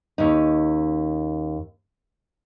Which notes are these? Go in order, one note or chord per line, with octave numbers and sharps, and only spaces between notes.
D#2 C#4 D#4